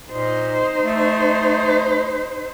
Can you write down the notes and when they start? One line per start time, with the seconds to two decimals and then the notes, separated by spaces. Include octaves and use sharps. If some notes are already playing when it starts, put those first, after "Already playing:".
0.11 A#2 D#4 C5
0.83 A3